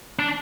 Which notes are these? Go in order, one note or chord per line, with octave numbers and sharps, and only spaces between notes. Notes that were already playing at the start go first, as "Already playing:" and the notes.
D4